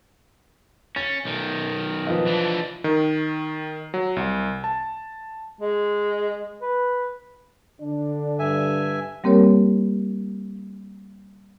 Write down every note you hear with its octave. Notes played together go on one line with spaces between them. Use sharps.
C#4 A6
B1 D#3
F3 B4 D#5
E3 D4
D#3
F#3
C2
A5
G#3
B4
D3 D4
G2 E5 G#5
G3 A#3 C4 G4 A#4 C#5